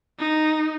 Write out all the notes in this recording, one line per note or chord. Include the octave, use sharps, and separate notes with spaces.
D#4